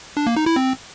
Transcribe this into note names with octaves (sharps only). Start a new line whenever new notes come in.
D4
A#3
D#4
E4
C4